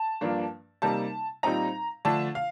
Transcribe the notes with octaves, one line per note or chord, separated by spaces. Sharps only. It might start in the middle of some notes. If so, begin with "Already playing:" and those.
Already playing: A5
G2 F3 A#3 D4
C3 G3 A#3 D#4 A5
A#2 G3 C4 D#4 A#5
D3 F3 A3 D4 A5
F5